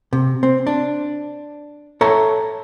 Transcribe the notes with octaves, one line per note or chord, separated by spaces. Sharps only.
C3
C4
D4
A4 C#5 E5 A#5